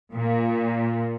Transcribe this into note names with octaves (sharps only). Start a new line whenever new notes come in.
A#2